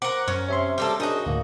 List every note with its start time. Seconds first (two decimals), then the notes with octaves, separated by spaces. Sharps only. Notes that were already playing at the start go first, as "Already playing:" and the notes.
0.02 A#4 C5 F#5 D6
0.28 F#2 C#4
0.49 C3 C#5 E5 C6
0.78 G3 A#3 A4
1.00 F#2 D4 D#4 F#4 G#4 D#6
1.26 D2 A2 A#3